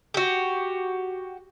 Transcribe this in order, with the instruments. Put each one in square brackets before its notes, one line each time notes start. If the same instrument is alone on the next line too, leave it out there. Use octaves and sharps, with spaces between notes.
[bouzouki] F#4 G4